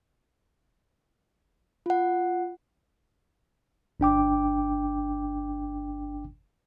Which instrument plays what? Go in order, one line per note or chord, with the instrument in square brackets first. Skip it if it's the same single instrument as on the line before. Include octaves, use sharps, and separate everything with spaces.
[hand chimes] F4 F#5
[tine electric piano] G1 D4 G5 D6